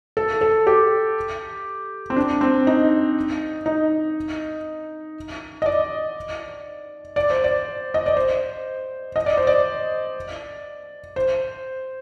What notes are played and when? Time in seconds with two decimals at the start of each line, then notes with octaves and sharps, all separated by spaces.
0.17 A4
0.41 A4
0.67 G4
2.10 C4
2.16 D4
2.41 C4
2.67 D#4
3.66 D#4
5.62 D#5
5.66 D5
7.16 D5
7.30 C5
7.44 D5
7.94 D#5
8.06 D5
8.17 C5
9.16 D#5
9.26 D5
9.37 C5
9.47 D5
11.16 C5